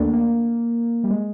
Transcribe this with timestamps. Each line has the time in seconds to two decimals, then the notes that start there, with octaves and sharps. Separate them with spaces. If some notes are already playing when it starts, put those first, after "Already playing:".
Already playing: D#2 A3 A#3 D4
0.13 A#3
1.04 G3
1.10 G#3